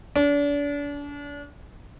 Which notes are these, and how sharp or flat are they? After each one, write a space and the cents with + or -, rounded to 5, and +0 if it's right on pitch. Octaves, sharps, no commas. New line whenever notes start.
D4 -35